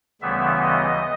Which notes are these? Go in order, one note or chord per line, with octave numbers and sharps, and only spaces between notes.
D2 C#3 E3 G3 B3 E5
D#5